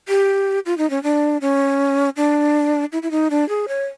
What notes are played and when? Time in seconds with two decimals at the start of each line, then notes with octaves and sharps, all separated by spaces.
0.08 G4
0.66 F4
0.78 D#4
0.90 C#4
1.03 D4
1.41 C#4
2.17 D4
2.92 E4
3.02 E4
3.11 D#4
3.30 D4
3.49 G#4
3.68 C#5